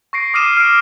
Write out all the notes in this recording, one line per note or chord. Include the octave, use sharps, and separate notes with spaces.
C#6 A#6 C7 D7
D6 D#6 F6 C7 D#7 E7
F6 D7